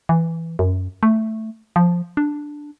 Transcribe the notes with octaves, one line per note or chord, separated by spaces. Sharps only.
E3
F#2
A3
F3
D4